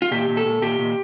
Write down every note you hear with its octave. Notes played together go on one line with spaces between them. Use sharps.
F4
A#2 G4
A#2
A4
A#2
A#2 G4
A#2